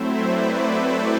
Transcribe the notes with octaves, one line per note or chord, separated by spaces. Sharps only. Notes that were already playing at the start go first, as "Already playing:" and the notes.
Already playing: F#3 A3 C4 E4 C5 E5
B4 D5
A4 C5